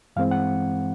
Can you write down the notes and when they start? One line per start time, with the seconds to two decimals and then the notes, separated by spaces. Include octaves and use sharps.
0.16 G2 E3 G#3 C4 F5
0.31 F#5